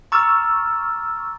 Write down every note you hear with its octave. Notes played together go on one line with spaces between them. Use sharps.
A#5 C#6 D6 E6 F6 A6